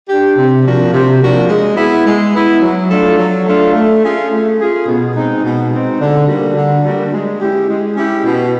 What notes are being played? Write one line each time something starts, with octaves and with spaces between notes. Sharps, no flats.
D4 G4
C3
F3 A#3 D4 F#4
C3
F3 A#3 D4 F#4
G#3
B3 E4
G#3
B3 E4
F#3
A3 D4 F4 A4
F#3
A3 D4 F4 A4
A3
C#4 F4 G#4
A3
C#4 F4 G#4
B2
G#3 C4 D#4
B2
G#3 C4 D#4
D3
G3 A#3 D4 F#4
D3
G3 A#3 D4 F#4
G#3
C#4 E4 G4
G#3
C#4 E4 G4
B2